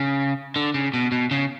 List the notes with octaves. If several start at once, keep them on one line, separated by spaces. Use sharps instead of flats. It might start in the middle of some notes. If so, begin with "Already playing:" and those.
Already playing: C#3
D3
C#3
B2
B2
C#3